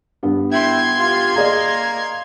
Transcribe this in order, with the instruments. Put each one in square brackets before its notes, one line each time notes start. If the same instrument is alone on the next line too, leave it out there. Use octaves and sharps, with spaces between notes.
[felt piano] G2 B3
[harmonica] E4 G5 [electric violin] C6 G#6
[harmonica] F4 G4
[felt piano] G#4 D5 D#5 [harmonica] F5 A#5